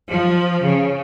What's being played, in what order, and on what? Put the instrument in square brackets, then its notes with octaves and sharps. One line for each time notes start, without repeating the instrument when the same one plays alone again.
[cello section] F3
C#3